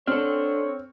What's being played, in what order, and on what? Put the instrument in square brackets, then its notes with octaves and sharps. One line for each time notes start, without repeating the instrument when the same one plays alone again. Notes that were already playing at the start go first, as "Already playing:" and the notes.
[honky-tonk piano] C4 [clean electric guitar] D4 A4 [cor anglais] C#5 [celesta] F6